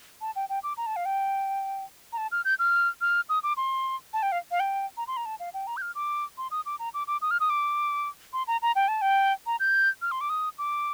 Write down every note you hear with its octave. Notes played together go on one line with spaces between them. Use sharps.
A5
G5
G5
D6
A#5
A5
F5
G5
A#5
A5
F6
G6
F6
F6
D#6
D6
C6
A5
G5
F5
F5
G5
A#5
C6
A#5
A5
F5
G5
A#5
G6
F6
D6
C6
D#6
D6
A#5
D6
D6
D#6
F6
D#6
D6
C6
A#5
A#5
G5
A5
G5
A#5
G6
F6
C6
D6
D#6
D6